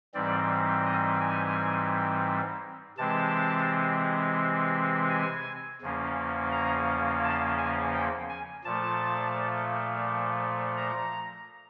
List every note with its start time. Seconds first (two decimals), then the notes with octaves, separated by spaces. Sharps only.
0.14 G#2 E3 G3 C4 D5
0.85 D#5
1.20 G#5
2.98 C3 E3 G#3 C4 A5
5.10 G#5
5.82 E2 C#3 F3 A#3 C#4
6.52 A#5
7.24 A5
7.58 G#5
7.94 G5
8.29 G#5
8.65 A#2 F3 A3 A5
10.77 A#5